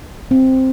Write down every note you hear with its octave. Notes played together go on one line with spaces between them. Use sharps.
C4